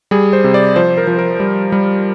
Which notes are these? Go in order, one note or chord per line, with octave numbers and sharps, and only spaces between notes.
G3 G#4
C5
C3
D5
F3 C5
A#4
F3
A#4
G3
G3